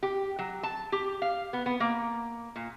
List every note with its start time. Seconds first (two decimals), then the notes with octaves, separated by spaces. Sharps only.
0.03 G4
0.39 F#3
0.63 A5
0.92 G4
1.22 F5
1.53 B3
1.66 B3
1.80 A#3
2.56 A#2